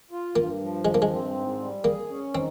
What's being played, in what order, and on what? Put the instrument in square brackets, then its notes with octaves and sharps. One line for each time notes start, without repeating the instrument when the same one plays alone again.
[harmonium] F4
[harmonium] G2 [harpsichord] A#3
[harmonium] F3
[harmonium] G2 [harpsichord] G#3
[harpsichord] A#3
G#3
[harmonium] C4
G#2
G3
[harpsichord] A#3 [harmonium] G#4
[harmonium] C#4
[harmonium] D#3 [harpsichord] C4